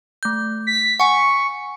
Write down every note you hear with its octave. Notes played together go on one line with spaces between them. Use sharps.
A3 G6
B6
F#5 G#5 C#6